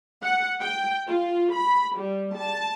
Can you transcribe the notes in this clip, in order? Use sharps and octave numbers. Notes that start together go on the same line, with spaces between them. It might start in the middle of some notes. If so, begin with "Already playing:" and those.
F#5
G5
F4
B5
G3
A5